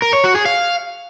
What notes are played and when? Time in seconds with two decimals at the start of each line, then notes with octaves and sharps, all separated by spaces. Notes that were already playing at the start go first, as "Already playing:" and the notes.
0.02 A#4
0.13 C#5
0.24 F#4
0.35 G#4
0.46 F5